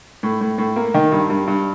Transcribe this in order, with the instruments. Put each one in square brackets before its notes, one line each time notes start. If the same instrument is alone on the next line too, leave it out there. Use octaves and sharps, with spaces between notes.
[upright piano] A2
A2
A2
A#3
D#3
G2
G2
G2